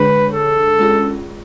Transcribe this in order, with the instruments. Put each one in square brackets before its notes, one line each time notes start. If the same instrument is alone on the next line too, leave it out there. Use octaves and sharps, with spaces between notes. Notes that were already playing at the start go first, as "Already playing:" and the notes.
Already playing: [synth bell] D3 G#3 D4 G#4 C#5 [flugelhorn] B4
[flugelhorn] A4
[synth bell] G#3 C#4 F4 G#4